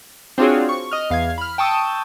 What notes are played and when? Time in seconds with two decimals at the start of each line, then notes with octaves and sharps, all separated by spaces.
0.38 C4 D4 F4 F#4 G#4 C#5
0.69 C#6
0.91 D#5 F6
1.10 E2 F5 F6 G#6
1.38 B5 F6
1.58 G5 A5 C#6 D#6 E6